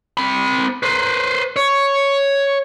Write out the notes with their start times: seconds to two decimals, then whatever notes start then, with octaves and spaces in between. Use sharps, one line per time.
0.17 C4 B5
0.83 B4 C5
1.56 C#5